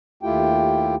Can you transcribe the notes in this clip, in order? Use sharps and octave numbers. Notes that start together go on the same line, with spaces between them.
D#2 A3 E4 F4 G4 G5